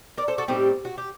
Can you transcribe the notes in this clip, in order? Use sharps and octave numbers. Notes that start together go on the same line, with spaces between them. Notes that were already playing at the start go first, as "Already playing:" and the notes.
A#4 D5
A4 C5
F#4 A4
A2 G3 C4 D#4 G4
F#4
G4